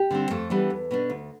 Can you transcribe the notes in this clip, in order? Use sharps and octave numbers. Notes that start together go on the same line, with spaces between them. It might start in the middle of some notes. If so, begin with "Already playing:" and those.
Already playing: G4 G5
D3 G3 C4
F2 A3 A4
E3 G3 B3 D4
E2
B2 B3 D4
D2